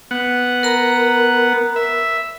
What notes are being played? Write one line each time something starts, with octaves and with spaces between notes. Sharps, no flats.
B3 F#5
A#4 A#5 B5
E5